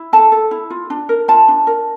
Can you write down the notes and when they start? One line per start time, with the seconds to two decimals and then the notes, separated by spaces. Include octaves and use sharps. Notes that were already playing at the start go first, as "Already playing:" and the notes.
Already playing: E4
0.13 A4 A5
0.32 A4
0.51 E4
0.70 F4
0.90 D4
1.09 A#4
1.28 F4 A5
1.48 D4
1.67 A#4